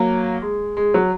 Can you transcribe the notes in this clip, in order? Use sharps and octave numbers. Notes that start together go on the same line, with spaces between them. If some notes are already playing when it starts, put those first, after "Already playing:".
Already playing: F#3 A#3
G#3
G#3
F#3